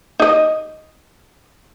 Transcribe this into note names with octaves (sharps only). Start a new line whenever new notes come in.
D#4 D#5